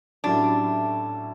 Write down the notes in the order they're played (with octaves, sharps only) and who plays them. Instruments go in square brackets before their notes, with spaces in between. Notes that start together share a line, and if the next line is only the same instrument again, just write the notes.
[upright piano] A2 F#3 C#4 E4 G4 [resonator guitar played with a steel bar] D4